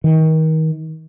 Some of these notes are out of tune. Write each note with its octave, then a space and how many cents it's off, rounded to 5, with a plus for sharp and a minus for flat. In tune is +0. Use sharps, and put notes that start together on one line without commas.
D#3 +30